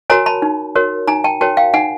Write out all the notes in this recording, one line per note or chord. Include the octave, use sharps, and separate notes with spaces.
F#4 A#4 C#5 G#5 A#5
A5 B5
D#4
F#4 A#4 C#5
D#4 G#5 A#5
G5 A5
F#4 A#4 C#5 G5 A5
F5 G5
D#4 F#5 G#5